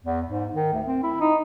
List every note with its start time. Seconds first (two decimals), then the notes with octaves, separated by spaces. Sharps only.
0.05 E2
0.29 G#2
0.53 D#3
0.73 D2
0.86 C4
1.03 E4
1.21 D#4